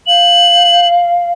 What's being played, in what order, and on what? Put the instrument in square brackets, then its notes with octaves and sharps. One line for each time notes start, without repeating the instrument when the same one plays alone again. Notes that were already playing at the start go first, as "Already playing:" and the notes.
[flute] F5 [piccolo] F#7